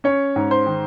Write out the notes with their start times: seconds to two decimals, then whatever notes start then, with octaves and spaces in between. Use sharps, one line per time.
0.04 C#4 C#5
0.36 G#2
0.51 C5
0.66 D#3